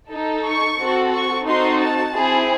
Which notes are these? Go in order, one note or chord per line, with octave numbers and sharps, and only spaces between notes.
D#4 A4
C#6
C4 F#4 A4
C#6
C4 D#4 F#4 A4 C6
A5
C4 E4 G#4